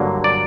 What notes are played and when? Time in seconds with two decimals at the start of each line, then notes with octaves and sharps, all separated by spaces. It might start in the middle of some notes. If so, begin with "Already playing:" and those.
Already playing: G2 D3 F#3 A#3
0.24 D5